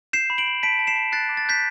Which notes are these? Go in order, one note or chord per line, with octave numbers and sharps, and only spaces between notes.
G6 C7 E7
B5
D7 F#7
B5
A5 B6 D7
A5
C7 E7
A5
F#6 A6 C7
D6
A6
F#6 G6 B6